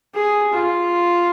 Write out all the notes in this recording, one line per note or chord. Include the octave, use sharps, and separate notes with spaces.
G#4
F4